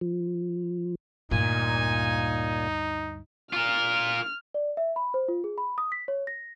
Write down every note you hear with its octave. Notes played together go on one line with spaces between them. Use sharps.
F3
D2 G2 A#2 D#4 G#5
F4 A#4 F6
D5
E5
B5
C5
F4
G#4
B5
D#6
B6
C#5
A#6